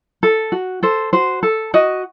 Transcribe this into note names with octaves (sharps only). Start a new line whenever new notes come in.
A4
F#4
A4 C5
F#4 C5
A4
F#4 D#5